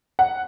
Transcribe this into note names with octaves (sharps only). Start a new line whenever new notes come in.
F#5